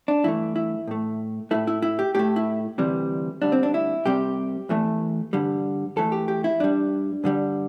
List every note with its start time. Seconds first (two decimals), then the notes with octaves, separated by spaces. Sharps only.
0.08 D4
0.24 G2 E3 A3 E4
0.56 E4
0.88 A2 A3
1.51 A2 A3 E4
1.67 E4
1.82 E4
1.99 G4
2.15 A2 A3 G4
2.36 E4
2.78 D2 C3 E3 G3
3.42 D2 D3 G3 D4
3.52 C4
3.63 D4
3.74 E4
4.05 C2 C3 G3 G4
4.69 E2 E3 A3
5.33 G2 D3 G3
5.96 E2 E3 A3 A4
6.12 G4
6.28 G4
6.44 E4
6.60 G2 G3 D4
7.24 G2 D3 G3